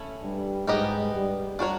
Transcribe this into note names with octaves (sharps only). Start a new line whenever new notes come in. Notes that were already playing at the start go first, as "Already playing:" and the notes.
Already playing: A3 C#4 E4
G2 G3
G#2 G#3 B3 D#4 G4 A#4 D#5
G2 G3
D4 F#4 A#4 C#5